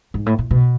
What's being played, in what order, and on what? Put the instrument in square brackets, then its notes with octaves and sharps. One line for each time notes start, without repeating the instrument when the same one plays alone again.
[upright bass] G#2
A2
A#2
B2